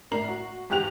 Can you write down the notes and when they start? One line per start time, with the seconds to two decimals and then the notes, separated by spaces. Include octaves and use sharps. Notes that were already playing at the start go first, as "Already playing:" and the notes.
0.11 A2 A#3 D4 A#5 C7 F#7
0.28 F#4
0.70 G#1 E2 G4 F#6 F7